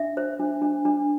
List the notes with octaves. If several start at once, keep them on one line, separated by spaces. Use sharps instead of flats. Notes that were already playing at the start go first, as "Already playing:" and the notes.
Already playing: D4 E5
C5
D4
D4
D4